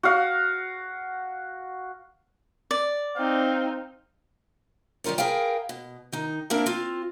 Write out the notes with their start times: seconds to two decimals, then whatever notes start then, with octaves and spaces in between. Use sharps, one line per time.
0.03 F#4 F5
2.71 D5
3.17 C4 D#4 F5
5.04 D#3 G3 F4 A#4 C#5
5.18 G#4 A#4 B4 F5 G5
5.69 B2
6.12 D#3 D#4
6.50 A#3 C4 D4 E4 A#4
6.66 C4 F4